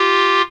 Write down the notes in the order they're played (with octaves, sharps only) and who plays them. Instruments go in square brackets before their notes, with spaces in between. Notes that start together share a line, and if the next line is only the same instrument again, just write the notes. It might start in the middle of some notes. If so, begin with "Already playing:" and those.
Already playing: [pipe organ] F4 G4